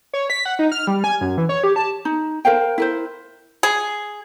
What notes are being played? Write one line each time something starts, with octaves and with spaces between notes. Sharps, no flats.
C#5
B6
F#5
D#4
F6
G3
G#5
F#2
E3
C#5
G4
A5
D#4
A#4 C5 F5 G5
E4 A#4 C5
G#4